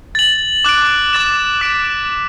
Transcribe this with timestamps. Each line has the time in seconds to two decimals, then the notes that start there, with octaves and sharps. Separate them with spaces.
0.15 A6 F#7
0.64 D6 F#6 D7
1.13 D6 A6 E7
1.61 D6 F#6 B6 D7